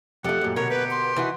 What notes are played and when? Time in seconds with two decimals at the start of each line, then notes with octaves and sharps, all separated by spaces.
0.24 F2 A3 G4 A4 F#5
0.41 F#2 A#2
0.56 B2 D3 A#4 C#5
0.70 G4 B4
0.91 C6
1.16 E3 D#4 F#4